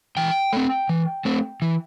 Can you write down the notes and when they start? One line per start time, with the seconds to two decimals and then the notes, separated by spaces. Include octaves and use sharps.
0.17 E3 G5
0.53 A3 C4
0.89 E3
1.25 A3 C4
1.62 E3